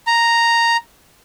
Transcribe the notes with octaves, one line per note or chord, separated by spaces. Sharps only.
A#5